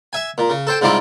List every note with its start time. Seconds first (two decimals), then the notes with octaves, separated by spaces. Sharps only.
0.13 E5 G#5
0.38 A#2
0.50 C#3
0.67 A4 C5 G5
0.81 G#2 C3 G3 E4 F4 D6